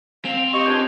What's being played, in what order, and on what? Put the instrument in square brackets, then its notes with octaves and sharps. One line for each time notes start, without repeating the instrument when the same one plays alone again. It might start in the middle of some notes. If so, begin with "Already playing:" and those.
[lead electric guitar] C4 [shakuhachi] F5 [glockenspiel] F7
[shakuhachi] G4 [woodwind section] D#5 C#6
[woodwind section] C#2 D4 G#5 [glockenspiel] G6